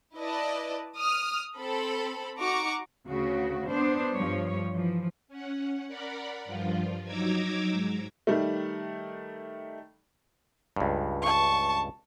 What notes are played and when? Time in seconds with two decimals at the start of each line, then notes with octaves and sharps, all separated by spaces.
0.16 E4 B4 D5 D#5 A5
0.97 D#6 F6
1.58 C4 A4 B5
2.39 D#4 F#4 A#5 C#6 D6
3.08 D2 C#3 F#4
3.70 B3 D4 C5
4.15 G2 F3 G3 C#5
4.72 E3 F3
5.28 C#4 F#5
5.88 A#4 D5 F#5 B5
6.45 G2 F3 F4
7.05 F#3 D#4 A#5 D6 E6 G#6
7.71 G#2
8.27 D#3 G3 A3
10.76 C#2 G2
11.22 A5 C#6